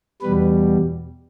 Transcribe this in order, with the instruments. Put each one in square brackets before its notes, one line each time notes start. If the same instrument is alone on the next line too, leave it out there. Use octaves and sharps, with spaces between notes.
[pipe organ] E2 B2 G3 B4